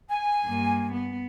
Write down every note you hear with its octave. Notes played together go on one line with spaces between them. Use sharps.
G#5
G2 A#3
B3